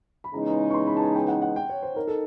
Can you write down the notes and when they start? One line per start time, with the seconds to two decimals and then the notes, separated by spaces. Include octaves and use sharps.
0.24 B5
0.33 C#3 E3 G#3 B3 D#4 A#5
0.70 C#6
0.74 C6
0.87 B5
0.97 A5
1.02 G#5
1.15 G5
1.28 F#5
1.42 F#5
1.56 G5
1.69 C#5
1.83 C5
1.96 D#4 A#4
2.08 A4